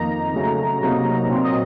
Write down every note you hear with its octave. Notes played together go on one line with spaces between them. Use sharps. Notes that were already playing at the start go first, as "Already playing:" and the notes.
Already playing: F2 D#3 A#3 D#4 A#5
C#3 F#3 A3
C3 F#3 A#3 D#4
A#2 F#3 C4
D#5